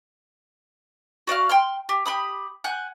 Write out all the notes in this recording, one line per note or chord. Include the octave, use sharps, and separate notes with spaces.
F#4 D5 D#5 F5
G5 C6 F6
G4
G4 B5 D#6
F#5 G#5 F#6 G6